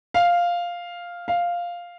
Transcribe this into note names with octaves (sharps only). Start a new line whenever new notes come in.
F5
F5